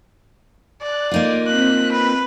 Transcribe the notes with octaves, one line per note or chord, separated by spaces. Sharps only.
D5 F#6
A#3 D#4 F4 D6
C4 F#6 B6
B4